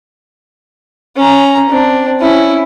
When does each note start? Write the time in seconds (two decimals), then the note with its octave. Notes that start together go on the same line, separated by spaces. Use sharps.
1.16 C#4 A#5
1.69 C4 D4
2.21 C#4 E4